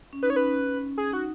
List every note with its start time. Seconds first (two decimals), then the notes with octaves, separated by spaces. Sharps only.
0.13 C#4
0.23 D#4 B4
0.30 C#5
0.36 C#4 B4
0.98 G#4
1.13 D#4 F#4